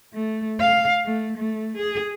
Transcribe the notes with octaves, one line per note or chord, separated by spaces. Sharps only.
A3
F5
A3
A3
G#4